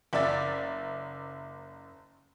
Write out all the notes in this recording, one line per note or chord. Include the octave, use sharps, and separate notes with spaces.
F#1 D5 E5 A6